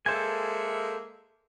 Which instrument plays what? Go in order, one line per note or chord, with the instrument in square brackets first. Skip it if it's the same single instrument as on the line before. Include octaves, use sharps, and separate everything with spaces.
[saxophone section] G#3 A#3 E5 [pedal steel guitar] A4 C5 G#5